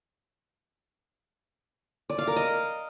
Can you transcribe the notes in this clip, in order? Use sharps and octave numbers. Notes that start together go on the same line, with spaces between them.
D5
F5
A#4
D#5